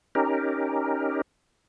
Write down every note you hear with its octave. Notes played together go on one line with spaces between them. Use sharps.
C#4 D#4 G4 A#4